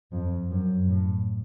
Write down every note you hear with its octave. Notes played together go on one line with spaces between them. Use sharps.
F2
F#2
A2